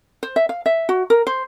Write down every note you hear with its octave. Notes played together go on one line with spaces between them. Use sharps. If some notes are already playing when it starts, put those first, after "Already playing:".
C5
E5
F5
E5
F#4
A#4
C5